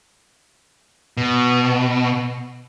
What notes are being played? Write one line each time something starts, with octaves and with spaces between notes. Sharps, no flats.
B2